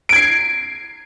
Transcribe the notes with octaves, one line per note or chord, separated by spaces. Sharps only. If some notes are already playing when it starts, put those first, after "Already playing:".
G#6 C7 D7